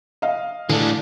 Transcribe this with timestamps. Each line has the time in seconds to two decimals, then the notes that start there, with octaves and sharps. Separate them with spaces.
0.22 D#5 F5
0.69 A2 D3 E3 G#3 A3 D4